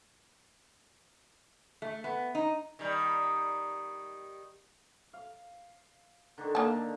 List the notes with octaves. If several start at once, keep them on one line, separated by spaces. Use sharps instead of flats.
A3
B3
D#4
D#3 G3
F5
D3 D#3 D4
A#3 A4 F5 A5